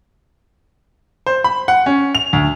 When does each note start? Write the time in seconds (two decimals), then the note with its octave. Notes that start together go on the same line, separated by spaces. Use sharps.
1.26 C5
1.44 B5
1.68 F#5
1.86 C#4
2.15 F7
2.33 D2